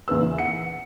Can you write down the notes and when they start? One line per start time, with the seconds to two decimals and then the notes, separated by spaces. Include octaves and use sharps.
0.08 E2 A#2 B4 E6
0.22 E3
0.38 F#5 C#7